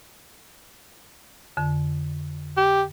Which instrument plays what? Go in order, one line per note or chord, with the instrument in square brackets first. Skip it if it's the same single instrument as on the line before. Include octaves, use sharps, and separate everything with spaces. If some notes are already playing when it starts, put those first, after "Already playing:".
[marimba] F2 D3
[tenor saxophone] G4